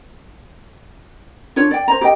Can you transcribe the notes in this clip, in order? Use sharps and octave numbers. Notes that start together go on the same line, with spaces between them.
D4 F4 C#5
D5 G5
C5 A#5
G4 D#5 G5